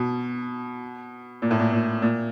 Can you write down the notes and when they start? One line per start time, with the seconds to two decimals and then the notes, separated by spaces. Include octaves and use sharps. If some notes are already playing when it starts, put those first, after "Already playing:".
Already playing: B2
1.42 A#2
1.51 A2
1.59 A#2
1.72 A#2
2.02 A#2